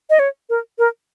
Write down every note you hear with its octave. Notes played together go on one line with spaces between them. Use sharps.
D#5
C#5
A#4
A#4